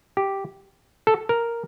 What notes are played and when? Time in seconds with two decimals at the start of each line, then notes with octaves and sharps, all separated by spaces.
0.17 G4
1.07 A4
1.29 A#4